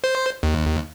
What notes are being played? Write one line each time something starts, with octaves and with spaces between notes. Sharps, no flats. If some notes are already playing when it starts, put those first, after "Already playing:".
C5
D#2